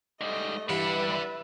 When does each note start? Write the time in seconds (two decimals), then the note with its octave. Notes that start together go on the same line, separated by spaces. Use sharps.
0.21 G#2 G3 A3 D#5
0.70 G2 E3 G3 B4 D5 E5 F#5 B5